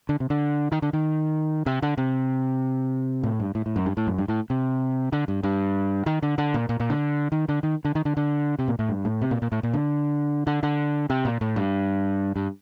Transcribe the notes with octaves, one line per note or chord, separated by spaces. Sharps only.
D3
C3
D3
D#3
D3
D#3
C3
D3
C3
A2
G2
A2
A2
F#2
G2
A2
F#2
G2
A2
C3
D3
G2
G2
D#3
D3
D3
A#2
A#2
A#2
D3
D#3
D3
D#3
D3
D#3
D3
D3
C3
A#2
A2
G2
A2
C3
A#2
A#2
A2
A#2
D3
D3
D3
C3
A#2
A2
G2
G2